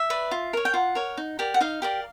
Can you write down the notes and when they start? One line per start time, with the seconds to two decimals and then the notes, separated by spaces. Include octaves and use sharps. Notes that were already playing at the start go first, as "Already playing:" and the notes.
Already playing: E5
0.10 B4 D5
0.31 F4
0.53 A#4 C#5
0.65 G5
0.74 F4 F#5
0.95 A#4 C#5
1.18 D#4
1.39 G4 A#4 D5
1.54 F#5
1.61 D#4 F5
1.82 G4 A#4 D5